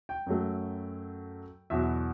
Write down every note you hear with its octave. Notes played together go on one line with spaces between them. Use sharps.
G5
F#2 F#3 A3
E2 B2 F#3 E5